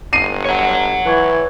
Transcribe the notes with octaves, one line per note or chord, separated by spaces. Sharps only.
G1 C7 D#7
C#5 F#5
E3 B4 C#6 G#6